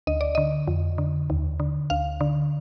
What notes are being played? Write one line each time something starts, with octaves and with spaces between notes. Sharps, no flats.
D2 D#5
D5
D3 D#5
F2
D3
D#2
D3
D2 F5
D3